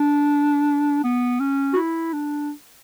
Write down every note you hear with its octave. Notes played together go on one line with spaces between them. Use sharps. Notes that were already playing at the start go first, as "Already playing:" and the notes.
Already playing: D4
B3
C#4
F#4
E4
D4